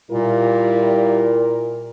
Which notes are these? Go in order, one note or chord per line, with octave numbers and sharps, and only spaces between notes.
A#2 G3 E4 F4 A#4